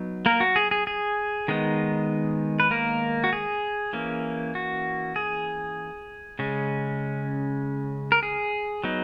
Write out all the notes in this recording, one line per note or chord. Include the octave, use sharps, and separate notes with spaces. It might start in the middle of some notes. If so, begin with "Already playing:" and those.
Already playing: F#3 B3 D#4
A#3 A#4
F#4
G#4
G#4
G#4
D#3 G#3 B3 D#4
B4
A#3 A#4
F#4
G#4
E3 A#3 C#4
F#4
G#4
C#3 G#3 C#4
A#4
G#4
F#3 B3 D#4